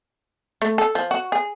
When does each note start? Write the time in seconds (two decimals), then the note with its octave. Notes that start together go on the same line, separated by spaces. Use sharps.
0.62 A3
0.78 A4
0.95 F3
1.11 F#4
1.32 G#4